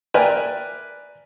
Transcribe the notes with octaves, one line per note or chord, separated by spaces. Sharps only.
A#4 B4 D5 E5 G5 G#5